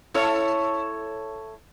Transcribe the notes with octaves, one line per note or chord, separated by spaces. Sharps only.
E4 A4 C#5